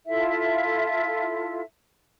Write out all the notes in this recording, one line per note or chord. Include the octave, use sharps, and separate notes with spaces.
E4 F4 A4 E5